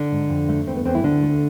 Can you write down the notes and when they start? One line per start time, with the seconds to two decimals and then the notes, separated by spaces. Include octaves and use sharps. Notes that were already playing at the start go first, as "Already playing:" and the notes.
Already playing: D3 D4
0.12 G#2
0.29 F2
0.49 A3
0.67 E2 C4
0.76 B3
0.85 E2 C4
0.94 E3 E4
1.04 D2 D3 D4
1.22 A3